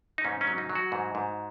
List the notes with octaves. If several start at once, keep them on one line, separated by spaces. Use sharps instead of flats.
D#4
G#2 C#4
C#4
F#3
D#4
F#3
F#4
G#2
G#2